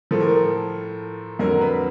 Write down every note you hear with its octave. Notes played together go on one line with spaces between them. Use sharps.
A2 F3 A4
A#4
A4
F2 D3 F#3 A#4
B4